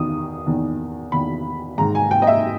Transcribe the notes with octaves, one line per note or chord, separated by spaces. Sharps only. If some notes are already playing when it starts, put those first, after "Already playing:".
Already playing: E2 D#3 D#6
E2 D#3
E2 D#3 B5
G#2 D#3 A#5
G#5
G5
D#5
E5